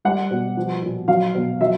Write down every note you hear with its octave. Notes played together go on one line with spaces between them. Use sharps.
G3 F#5
B2
F3
A#2
F#3 F5
B2
F#3 E5